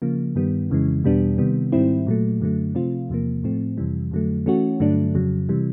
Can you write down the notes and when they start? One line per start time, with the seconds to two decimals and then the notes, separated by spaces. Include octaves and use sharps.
0.02 C#3 F3 A#3
0.35 G2 D#3 G3 B3
0.70 F2 C#3 E3 G#3
1.04 E2 B2 G3 B3 D4
1.38 C3 D#3 G3 B3
1.72 G#2 D#3 G3 C4 E4
2.07 A#2 F#3 A3
2.40 F#2 D3 F#3 A3
2.75 C3 F3 A3 C4 F4
3.09 E2 C3 F3 A#3
3.43 A2 F3 A3 C4
3.77 F2 C3 E3 G3
4.11 F2 D3 F#3 A3
4.46 E3 A3 C#4 F#4
4.80 G2 D3 F#3 A3 D4
5.15 F2 C#3 F#3
5.49 C3 E3 G3